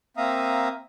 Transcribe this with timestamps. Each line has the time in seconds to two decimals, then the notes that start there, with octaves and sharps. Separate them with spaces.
0.17 A#3 C4 E5 F5 A#5 D#6